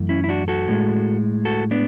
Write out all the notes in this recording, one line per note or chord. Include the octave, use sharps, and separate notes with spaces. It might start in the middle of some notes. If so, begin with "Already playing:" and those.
Already playing: F#2 E3 A3
C#4 E4
E4
D4 F#4
F#4 A4
A2 G#3
F#4 A4
B3 D4